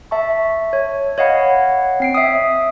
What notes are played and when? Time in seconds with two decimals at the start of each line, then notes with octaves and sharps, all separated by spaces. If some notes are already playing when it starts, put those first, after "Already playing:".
0.11 E5 A5 C#6
0.73 C#5
1.18 C#5 D#5 F5 F#5 B5
2.00 C4 C7 D7
2.14 E5 D#6